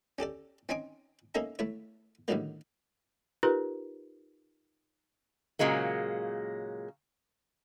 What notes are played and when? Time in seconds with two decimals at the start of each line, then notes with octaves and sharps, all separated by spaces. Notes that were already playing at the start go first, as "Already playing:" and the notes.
0.19 C#4 G4 A4 D5
0.69 C4 C#4 D#4 G#5 D6
1.35 A#3 C#4 D#4 A4 E5 A#5
1.59 A3 E4 C#5
2.28 A2 D3 D#3 F#3 G3 A#3
3.43 D#4 F4 G4 A#4 B4
5.59 A#2 C#3 F#3 G#3 A#3